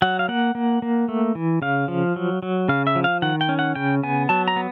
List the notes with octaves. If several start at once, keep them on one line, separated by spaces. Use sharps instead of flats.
F#3 F#5
F5
A#3 F#5
A#3
A#3
A3
E3
C#3 F5
F3
F#3
F#3
C#3 F5
E5
F3
F5
D#3 F#5
G5
C#4
F#5
C#3 G5
B3 G#5
F#3 A5
A#5
B3